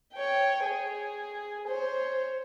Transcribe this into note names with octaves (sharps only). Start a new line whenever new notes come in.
C#5 G5
G#4
C5 C#5